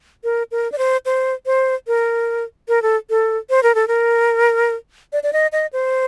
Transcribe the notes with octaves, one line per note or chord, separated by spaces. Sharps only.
A#4
A#4
D5
C5
C5
C5
A#4
A#4
A4
A4
C5
A#4
A4
A#4
D5
D5
D#5
D#5
C5